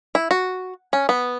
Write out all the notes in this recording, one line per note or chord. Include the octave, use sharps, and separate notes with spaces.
E4
F#4
C#4
B3